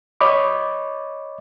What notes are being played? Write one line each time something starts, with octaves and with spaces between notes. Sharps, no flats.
C#5 D#5 B5 D6